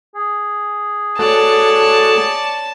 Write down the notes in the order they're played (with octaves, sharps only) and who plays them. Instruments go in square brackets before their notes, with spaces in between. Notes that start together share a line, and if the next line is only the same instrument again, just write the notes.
[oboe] G#4
[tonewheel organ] A3 F#4 A4 [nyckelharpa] C#5 D5 [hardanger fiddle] A5